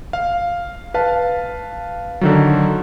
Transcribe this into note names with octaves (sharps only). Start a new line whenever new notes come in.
F5
B4 F5 A5
D3 D#3 F#3